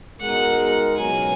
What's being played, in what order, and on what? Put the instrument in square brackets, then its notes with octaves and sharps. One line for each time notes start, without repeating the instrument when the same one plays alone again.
[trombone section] B2 G#3 D#4 A#4 [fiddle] F#5
[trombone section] C#2 B2 F#3 [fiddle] G#5